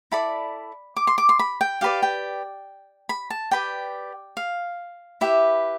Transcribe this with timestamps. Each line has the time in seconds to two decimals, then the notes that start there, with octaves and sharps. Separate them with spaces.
0.12 E4 A4 D5 B5
0.96 D6
1.07 C6
1.18 D6
1.29 C6
1.39 B5
1.61 G5
1.81 G4 B4 D5 F5
2.03 G5
3.09 B5
3.30 A5
3.51 G4 B4 D5 G5
4.37 F5
5.21 E4 G4 B4 E5